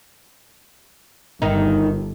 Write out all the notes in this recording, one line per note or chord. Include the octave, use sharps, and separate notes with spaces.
G1 D#3 D#4